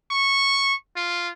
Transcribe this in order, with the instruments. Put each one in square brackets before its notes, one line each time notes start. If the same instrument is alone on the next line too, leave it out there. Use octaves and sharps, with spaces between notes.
[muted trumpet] C#6
F4